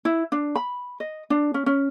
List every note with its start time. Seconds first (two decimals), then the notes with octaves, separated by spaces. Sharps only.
0.05 E4
0.32 D4
0.55 B5
1.00 D#5
1.30 D4
1.54 C#4
1.66 C#4